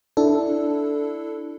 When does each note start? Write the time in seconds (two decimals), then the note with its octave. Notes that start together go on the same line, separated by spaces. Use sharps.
0.17 D4 E4 A4